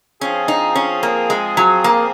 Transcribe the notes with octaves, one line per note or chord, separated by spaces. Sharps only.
F3 C4 C#4 F4 G#4
D#4
C#4
A#3
G#3
F#3
A#3